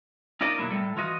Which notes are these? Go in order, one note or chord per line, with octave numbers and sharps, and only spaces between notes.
D#4 F4 A#4 D5 D#5
B2 D#3 F#3 A#3 E4
A2 G3 A4
E3 F4 F#4 D#5